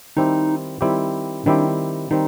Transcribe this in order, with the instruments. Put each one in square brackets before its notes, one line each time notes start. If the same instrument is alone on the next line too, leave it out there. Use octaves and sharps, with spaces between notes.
[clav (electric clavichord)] D#3 G3 C4 E4 G4 [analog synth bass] D#4
[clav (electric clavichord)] D#3 G3 C4 E4 G4
[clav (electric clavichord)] D#3 G3 C4 E4 G4 [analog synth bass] D4
[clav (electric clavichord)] D#3 G3 C4 [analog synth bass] D#4